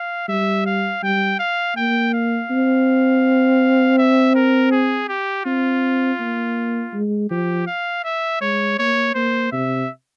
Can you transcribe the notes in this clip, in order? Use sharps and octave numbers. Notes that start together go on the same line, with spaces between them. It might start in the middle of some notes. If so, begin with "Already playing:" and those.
Already playing: F5
G3 E5
F5
G3 G5
F5
A#3 G5
F5
C4
E5
A#4
G#4
G4
C4 F4
A#3
G#3
F3 G4
F5
E5
G#3 C#5
A#3 C#5
A#3 C5
C3 E5